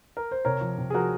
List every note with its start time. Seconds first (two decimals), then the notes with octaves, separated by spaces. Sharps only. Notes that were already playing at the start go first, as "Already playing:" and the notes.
0.17 A#4
0.31 C5
0.45 C3 A#4 C#5
0.61 F3
0.78 C3
0.90 G#4
0.94 F3 F#4 A#4